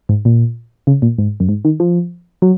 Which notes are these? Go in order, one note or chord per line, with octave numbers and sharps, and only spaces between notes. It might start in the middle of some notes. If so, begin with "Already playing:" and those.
G#2
A#2
C#3
A#2
G#2
F#2
G#2
D#3
F3
F#3